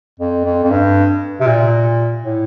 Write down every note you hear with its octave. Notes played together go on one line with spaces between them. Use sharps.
F2
F2
F2
G2
C3
A#2
A2